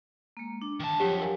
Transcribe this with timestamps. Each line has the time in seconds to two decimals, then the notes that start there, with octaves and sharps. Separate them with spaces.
0.37 G#3 A#3
0.62 D4
0.80 D#3 A5
1.00 F2 F#3 G4 C#5 G5
1.21 A#4 F5 G#5